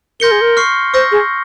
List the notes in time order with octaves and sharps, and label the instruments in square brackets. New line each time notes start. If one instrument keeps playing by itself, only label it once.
[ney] A#4 [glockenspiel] C6 G6 A#6 C#7 G7
[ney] G#4
A#4
[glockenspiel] C#6 F6 C7
[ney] C5 [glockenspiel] C#6 E6 G6 A#6
[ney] G#4